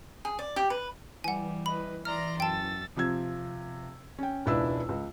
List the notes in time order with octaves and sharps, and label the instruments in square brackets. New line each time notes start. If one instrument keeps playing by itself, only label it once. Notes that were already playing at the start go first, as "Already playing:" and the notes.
[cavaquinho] G#4
D5
G4
B4
[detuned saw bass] E3 [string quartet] G3 [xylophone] F#5 G#5
[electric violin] B4 D#5 [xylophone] B5
[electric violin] D5 E5 [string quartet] A#5 C6 [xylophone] F6
[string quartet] F#2 [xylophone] G5 A5 [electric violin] E6 A6
[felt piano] C3 F3 E6 G#6
C#4 G5
E1 C#2 D4 E4 B4 E6
C#2